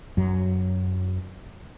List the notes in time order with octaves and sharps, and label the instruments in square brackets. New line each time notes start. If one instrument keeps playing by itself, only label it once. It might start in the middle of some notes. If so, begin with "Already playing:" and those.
[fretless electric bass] F#2 F#3